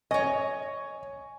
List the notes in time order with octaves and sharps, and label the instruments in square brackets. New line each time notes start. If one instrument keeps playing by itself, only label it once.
[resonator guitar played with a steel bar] C#5 D#5 [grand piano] G#5 C#6